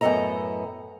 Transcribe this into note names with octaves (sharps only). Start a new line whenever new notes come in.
F#2 A2 B3 A4 D#5 A#5